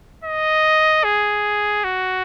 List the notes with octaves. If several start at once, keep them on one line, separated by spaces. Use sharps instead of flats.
D#5
G#4
F#4